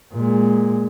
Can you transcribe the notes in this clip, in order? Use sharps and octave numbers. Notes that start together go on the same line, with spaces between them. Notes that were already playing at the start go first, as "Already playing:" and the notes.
A#2 G#3